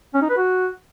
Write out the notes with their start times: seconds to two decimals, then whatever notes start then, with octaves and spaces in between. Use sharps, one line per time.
0.14 C#4
0.22 D#4
0.30 B4
0.37 F#4